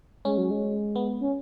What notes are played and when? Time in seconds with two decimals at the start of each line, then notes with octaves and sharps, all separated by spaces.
0.25 G#3 C#4
0.38 F#3
0.51 G#3
0.96 B3
1.21 C#4